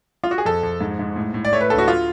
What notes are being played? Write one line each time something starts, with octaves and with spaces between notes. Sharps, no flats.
F4
F#4
G#4
F2 A4
F2
G#2
G#2
A2
A2
D5
A3 C#5
B4
D2 A4
F#4
F4